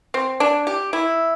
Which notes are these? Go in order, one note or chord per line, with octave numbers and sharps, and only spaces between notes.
C4
D4
G4
E4